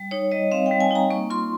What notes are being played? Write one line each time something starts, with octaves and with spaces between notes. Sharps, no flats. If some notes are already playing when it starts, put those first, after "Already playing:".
Already playing: G3
D#4 C#5
G3 D#5
C4 F5
G5
G3
G#5
D#4 A#5
A#3 C#6
F4 C6